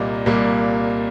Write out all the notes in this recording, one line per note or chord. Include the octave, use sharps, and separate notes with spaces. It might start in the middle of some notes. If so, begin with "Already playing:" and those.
Already playing: C2 A#2 G3 A#3 D#5
C2 A#2 G3 A#3